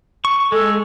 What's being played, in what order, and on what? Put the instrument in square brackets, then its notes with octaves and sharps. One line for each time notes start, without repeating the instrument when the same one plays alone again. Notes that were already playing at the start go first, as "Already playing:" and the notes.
[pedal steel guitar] C#6
[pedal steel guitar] G#3 [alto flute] A4